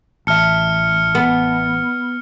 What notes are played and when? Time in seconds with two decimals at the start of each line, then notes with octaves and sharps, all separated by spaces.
0.27 A1 E5 A5 F6 C#7
1.15 B3